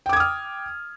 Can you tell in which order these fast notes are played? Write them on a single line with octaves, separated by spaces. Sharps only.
G5 D6 G#6 D#6 F6